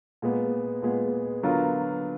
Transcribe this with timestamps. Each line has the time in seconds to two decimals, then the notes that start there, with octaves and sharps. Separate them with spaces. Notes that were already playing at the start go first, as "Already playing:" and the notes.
0.22 A#2 G#3 B3
0.82 A#2 G#3 B3
1.43 D3 F#3 B3 F4 A#4